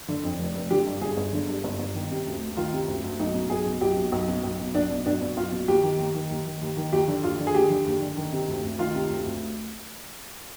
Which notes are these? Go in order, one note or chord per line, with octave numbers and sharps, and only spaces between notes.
D3
F2
F1
F1
D3 G4
G2
G1 G#4
G1
D3
G2
G1
G1
D#3
C3
D2
D2
D#3 F4
C3
D2
D2
B1 D#4
B2
B1 G#4
B2
B1 G4
B2
B1
B2
B1
B2
B1 D4
B2
B1 D4
B2
B1 F4
B2
D#2 G4
D#3
D#2
D#3
D#2
D#3
D#2
D#3
D#2 G4
D3
D#2 F4
D3
G#4
D#2 G4
D3
D#2
D3
D#3
C3
D2
D2
D#3 F4
C3
D2
D2